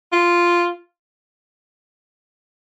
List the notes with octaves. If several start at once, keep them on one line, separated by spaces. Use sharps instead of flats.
F4